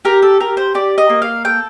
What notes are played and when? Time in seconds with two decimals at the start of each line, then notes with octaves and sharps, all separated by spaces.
0.05 G4 A#4
0.22 A4
0.40 G4 A#4
0.57 C5
0.75 G4 D5
0.98 D#5
1.10 A#3
1.22 F5
1.45 A4 G5